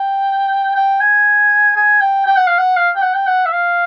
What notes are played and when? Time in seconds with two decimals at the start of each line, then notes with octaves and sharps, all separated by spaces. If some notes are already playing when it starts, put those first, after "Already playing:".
Already playing: G5
0.76 G5
1.01 G#5
1.76 G#5
2.01 G5
2.26 G5
2.37 F#5
2.47 F5
2.58 F#5
2.77 F5
2.96 G5
3.02 F#5
3.14 G5
3.27 F#5
3.46 E5
3.52 F5